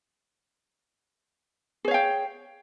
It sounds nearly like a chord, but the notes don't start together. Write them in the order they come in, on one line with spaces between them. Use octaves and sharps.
G#4 C#5 F5 G5